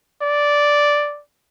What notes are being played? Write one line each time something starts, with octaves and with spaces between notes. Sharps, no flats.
D5